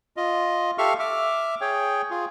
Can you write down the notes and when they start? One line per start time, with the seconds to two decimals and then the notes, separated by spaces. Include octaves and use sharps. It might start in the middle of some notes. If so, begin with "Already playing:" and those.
0.17 F4 D#5
0.78 G4 A4 E5 F5 C#6 F6
0.99 E5 D6 F6
1.61 G#4 C#5 G5
2.11 F4 G#4